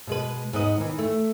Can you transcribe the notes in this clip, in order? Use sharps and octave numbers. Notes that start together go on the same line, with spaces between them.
B2 G#3 B4
G#2 B3 D#5
D#3 E3
A3